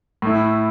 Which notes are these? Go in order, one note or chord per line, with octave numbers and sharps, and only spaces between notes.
A2 A3 E4